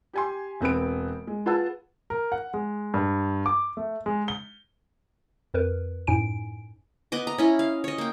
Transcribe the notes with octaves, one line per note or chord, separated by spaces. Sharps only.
G4 G#5 C6
E1 C4 B4 B5 D7
G#3
F4 G#4 B4 F#5 A5 E6
A#4
F#5
G#3
G2
D6
A3
G#3
G7
F2 A#4 B4
F#2 A2 D#4 G#5 D7
B3 D#5 D6
A#5
C#4 E4 D#5
F5
C#5 D#5
A#3 G5